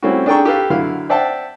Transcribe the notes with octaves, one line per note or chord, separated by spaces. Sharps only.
G3 A3 C4 C#4 E4 F#4
D4 G#4 A4 G5 A#5 C#6
G4 A4 B4 F5
D3 F#3 E4 F5
C5 D5 E5 F#5 G5 A5